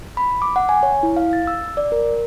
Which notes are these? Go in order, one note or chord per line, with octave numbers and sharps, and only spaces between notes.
B5
D6
F#5
G#5
C#5
E4
F5
A6
E6
D5
A#4